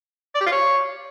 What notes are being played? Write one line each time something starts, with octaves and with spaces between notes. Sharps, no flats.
D5
G4
F4
C#5